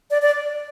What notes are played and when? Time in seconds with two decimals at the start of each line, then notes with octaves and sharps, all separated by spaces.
0.11 D5
0.22 D5